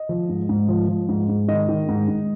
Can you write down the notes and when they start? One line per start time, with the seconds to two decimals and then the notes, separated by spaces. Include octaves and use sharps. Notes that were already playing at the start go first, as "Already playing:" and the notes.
Already playing: D#5
0.09 F3
0.29 G#2
0.49 G#2
0.68 F3
0.89 F3
1.09 G#2
1.29 G#2
1.48 D#3 D#5
1.69 D#3
1.88 G#2
2.08 G#2